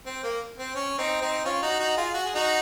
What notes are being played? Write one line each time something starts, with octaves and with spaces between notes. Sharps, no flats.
C4
A#3
C4
C#4
C4 D#4
C4 D#4
C#4 F4
D#4 F#4
D#4 F#4
F4 G#4
F#4
G#4
D#4 F#4